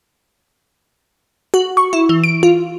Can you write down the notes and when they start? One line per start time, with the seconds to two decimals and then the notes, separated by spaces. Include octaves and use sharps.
1.54 F#4
1.77 C#6
1.93 E4
2.09 E3
2.24 D7
2.43 F4